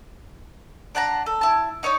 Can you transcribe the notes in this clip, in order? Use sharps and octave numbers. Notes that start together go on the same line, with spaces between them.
D4 F#5 A5 A#5
A4
E4 A5
D#4 C#5 D5 D#6